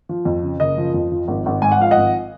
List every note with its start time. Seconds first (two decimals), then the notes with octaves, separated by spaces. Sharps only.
0.09 F3
0.25 F2
0.43 C#3
0.60 F#1 D#5
0.78 F3
0.94 F2
1.12 F3
1.28 G#1
1.46 G#1
1.62 G#2 G#5
1.72 F#5
1.80 F3 F5
1.91 D#5 F#5
1.96 G#1